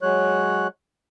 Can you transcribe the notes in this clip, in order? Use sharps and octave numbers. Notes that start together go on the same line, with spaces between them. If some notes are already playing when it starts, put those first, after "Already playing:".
F#3 G#3 C#5 F#6